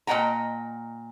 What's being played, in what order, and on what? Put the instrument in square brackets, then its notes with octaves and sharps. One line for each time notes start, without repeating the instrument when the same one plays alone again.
[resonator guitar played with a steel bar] A#2 D#5 F#5 G5 A#5